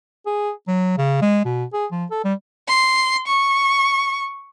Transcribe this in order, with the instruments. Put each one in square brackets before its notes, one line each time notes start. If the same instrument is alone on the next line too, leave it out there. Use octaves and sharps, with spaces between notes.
[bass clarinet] G#4
F#3
C#3
G#3
B2
G#4
F3
A4
G3
[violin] C6
C#6